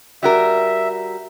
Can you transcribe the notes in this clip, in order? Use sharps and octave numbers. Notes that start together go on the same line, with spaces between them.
G3 F#4 A#4 E5